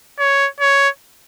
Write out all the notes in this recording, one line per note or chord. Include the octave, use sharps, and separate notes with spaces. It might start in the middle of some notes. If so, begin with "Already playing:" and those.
C#5
C#5